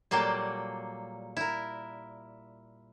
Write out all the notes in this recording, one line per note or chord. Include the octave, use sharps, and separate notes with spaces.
A#2 F#3 G3 A#3 A4
E4 A#4